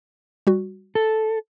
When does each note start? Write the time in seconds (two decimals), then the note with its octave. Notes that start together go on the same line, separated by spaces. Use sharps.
0.47 G3 F#4
0.95 A4